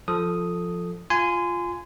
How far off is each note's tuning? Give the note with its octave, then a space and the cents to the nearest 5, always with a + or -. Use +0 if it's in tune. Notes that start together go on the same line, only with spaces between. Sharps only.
F3 +0 A4 +0 D#6 +0
F4 +0 G#5 +0 C6 -30